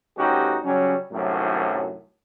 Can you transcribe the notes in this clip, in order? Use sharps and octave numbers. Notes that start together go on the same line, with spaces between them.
D2 G2 C#4 D#4 F#4 G4
C#3 F#3 G3 C#4
C2 F#2 A2 D#3 F#3